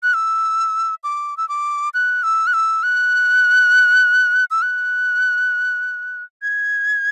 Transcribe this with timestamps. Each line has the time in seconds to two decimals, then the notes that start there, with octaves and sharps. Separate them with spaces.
0.03 F#6
0.14 E6
1.04 D6
1.37 E6
1.49 D6
1.94 F#6
2.23 E6
2.47 F#6
2.54 E6
2.83 F#6
4.51 E6
4.62 F#6
6.42 G#6